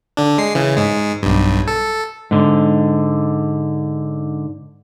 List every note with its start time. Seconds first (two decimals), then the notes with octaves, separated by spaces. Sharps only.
0.17 D3 D4
0.38 G#3 C7
0.55 C#3 E3
0.77 G#2 G#3
1.23 B1 G2
1.68 A4
2.31 G#2 D3